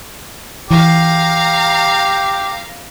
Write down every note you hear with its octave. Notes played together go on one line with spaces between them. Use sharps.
E3 G4 F5 A#5